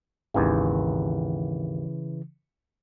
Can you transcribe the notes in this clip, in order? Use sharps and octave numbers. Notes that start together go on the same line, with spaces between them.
G#1 D#2 C#3 E3